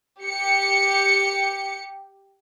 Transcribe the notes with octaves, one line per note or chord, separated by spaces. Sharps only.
G4 C#7